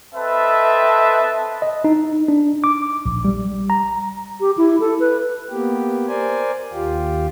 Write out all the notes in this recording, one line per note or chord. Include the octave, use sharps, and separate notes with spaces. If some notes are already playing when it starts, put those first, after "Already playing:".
C4 A4 B4 D#5 E5 A5
D#5
D#4
D4
D6
A#1
G3
A#5
G4
E4
A4
B4
A#3 B3 G4
A#4 C5 D5 G#5
D#2 F4 G4